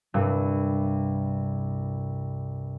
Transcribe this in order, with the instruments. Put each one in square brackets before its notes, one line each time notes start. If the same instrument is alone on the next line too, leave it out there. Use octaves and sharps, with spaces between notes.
[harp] C2 G2